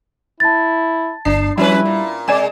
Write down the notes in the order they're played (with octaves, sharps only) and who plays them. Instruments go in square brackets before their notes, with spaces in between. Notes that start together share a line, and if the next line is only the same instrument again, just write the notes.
[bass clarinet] E4 [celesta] A5 A6
[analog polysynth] G1 C7 [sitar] D4
[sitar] F3 C#4 B4 [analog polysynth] G3 [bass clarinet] E4
[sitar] A#2
[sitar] C3 G#3 [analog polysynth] D5 G#5 E7